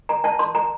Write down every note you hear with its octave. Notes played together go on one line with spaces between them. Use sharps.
A#5
A5
C6
A#5